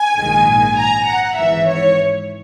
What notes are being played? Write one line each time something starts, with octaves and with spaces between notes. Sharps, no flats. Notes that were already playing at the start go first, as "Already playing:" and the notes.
Already playing: G#5
A#1 G#2 D#3 G#3
A#5
F#5
G#1 G#2 E3 E5
C#5